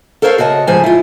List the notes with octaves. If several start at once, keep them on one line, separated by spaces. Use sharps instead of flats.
A4 A#4 C5 C#5 E5 F5
C#3 F#4 D#5 G#5 A5
G#2 C#3 F3 C5 G#5
E4 F4